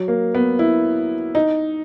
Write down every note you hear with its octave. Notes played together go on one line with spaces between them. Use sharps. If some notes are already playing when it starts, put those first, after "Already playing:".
Already playing: F#3
A#3
B3
E4
D#4